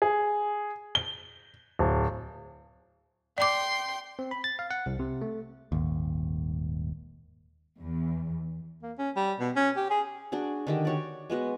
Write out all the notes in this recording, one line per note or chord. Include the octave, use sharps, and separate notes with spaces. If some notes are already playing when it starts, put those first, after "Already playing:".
G#4
G7
D1
D5 G5 C6 D6
C4
B5
A6
F5
F#5
C2
C3
A3
D#1 G#1 D#2
E2
A#3
C#4
G3
B2
C#4
G4
G#4
D4 F#4 G#4
D3 D#3 G4
F#4 C#5 D5
G#3 B3 F#4 F#5